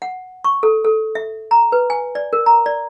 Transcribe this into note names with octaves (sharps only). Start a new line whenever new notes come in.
F#5
C#6
A4
A4
E5
A#5
B4
G#5
D5
A#4
A#5
D5